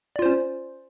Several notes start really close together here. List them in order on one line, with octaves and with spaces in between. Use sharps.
D5 F4 C5 C#4